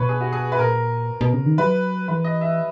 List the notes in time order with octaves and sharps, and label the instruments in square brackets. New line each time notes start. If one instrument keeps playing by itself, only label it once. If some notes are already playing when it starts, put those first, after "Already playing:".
Already playing: [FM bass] B2 [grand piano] B4 C#5
[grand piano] G#4
F#4
G#4
B4
[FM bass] A#2 [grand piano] A#4
[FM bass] B2
C#3
D#3
[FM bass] F#3 [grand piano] B4
[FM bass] E3 [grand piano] B4
[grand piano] D#5
E5